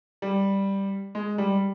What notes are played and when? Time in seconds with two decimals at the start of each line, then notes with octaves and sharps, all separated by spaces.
0.22 G3
1.15 G#3
1.38 G3